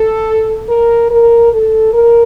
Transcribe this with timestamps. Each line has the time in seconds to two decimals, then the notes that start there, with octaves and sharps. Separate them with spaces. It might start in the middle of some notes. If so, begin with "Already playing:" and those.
Already playing: A4
0.69 A#4
1.11 A#4
1.52 A4
1.93 A#4